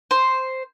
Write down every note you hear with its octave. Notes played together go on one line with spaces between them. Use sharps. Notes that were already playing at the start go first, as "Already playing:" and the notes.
C5